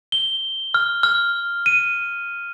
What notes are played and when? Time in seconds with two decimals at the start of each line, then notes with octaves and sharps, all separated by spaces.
0.12 G7
0.74 F6
1.03 F6
1.66 D#7